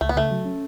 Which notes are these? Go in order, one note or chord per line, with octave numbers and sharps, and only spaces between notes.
C#2 A3
B3
C#3 A3
F#3
C#4